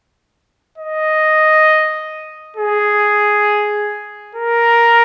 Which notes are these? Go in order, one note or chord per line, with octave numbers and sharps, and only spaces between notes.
D#5
G#4
A#4